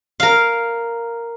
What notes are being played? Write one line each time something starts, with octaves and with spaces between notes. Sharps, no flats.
A#4 F5